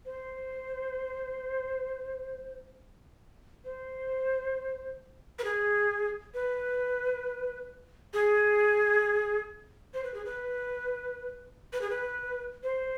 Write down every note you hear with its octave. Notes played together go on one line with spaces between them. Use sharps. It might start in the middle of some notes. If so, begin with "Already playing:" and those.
C5
C5
B4
G#4
B4
G#4
C5
B4
G#4
B4
B4
G#4
B4
C5